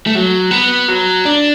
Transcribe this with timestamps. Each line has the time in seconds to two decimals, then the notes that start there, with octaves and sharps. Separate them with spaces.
0.07 A3
0.15 F#3
0.51 B3
0.88 F#3
1.25 D4